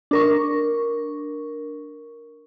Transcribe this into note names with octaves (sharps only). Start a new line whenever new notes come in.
D4 A#4 C#6